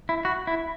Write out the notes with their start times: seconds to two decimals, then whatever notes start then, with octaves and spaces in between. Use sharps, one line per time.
0.09 E4
0.25 F#4
0.47 E4